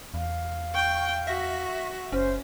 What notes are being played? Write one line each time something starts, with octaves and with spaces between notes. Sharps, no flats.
E2 F5
G5 C#6 G6
F#4 E5 A#6 B6
F#1 C#4 C5